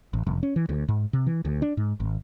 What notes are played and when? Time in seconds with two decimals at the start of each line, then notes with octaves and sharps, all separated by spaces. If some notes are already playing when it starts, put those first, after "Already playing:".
0.13 A1
0.27 F1
0.43 C#4
0.56 E3
0.69 D2
0.88 G#2
1.13 C3
1.26 E3
1.45 D2
1.62 D4
1.77 G#2
2.00 G#1